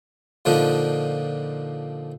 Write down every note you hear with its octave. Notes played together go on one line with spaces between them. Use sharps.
A#2 D3 F3 D4 D#4